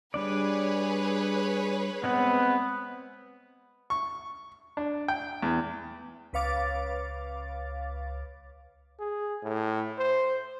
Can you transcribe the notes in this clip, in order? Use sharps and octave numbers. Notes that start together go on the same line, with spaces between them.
G3 D4 G#4 B4 C#5 D5
G#3 B3 C4 F#5
C#6
D4
G5
E2
C#2 B4 C#5 F5 D6 A6
G#4
A2
C5